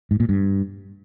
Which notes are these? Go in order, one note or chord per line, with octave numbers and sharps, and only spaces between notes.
G#2
A#2
G2